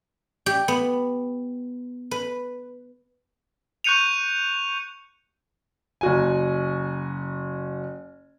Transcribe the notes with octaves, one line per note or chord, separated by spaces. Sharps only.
G4
B3
B4
C#6 F#6 G6 C#7 D#7 F7
F#1 F#4 G#5